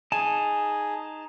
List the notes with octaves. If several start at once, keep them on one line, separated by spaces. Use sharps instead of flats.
D#4 G#4 G#5 A5